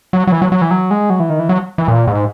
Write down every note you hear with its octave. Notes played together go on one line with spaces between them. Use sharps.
F#3
F#3
E3
F#3
F#3
E3
F#3
G#3
F#3
E3
D#3
E3
F#3
E3
A#2
G#2